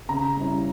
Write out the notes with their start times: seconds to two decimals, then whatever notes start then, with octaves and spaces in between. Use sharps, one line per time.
0.09 C#3 A#5
0.37 G3 C#4 E4